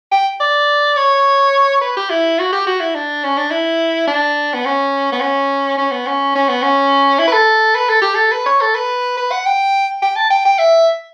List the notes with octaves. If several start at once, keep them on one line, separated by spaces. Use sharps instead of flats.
G5
D5
C#5
B4
G4
E4
F#4
G4
F#4
E4
D4
C#4
D4
E4
D4
B3
C#4
B3
C#4
C#4
B3
C#4
C#4
B3
C#4
E4
B4
A4
B4
A4
G4
A4
B4
C#5
A4
B4
B4
F#5
G5
G5
A5
G5
G5
E5